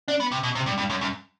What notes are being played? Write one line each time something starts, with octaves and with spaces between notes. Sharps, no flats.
D4
B3
C3
B2
C3
G2
G2
F#2
F#2